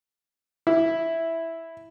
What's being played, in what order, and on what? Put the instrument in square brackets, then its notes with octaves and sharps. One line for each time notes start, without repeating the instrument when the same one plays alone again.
[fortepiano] E4